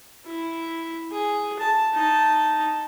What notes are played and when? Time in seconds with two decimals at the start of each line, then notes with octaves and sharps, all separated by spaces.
0.26 E4
1.11 G#4
1.59 A5
1.93 D#4 A5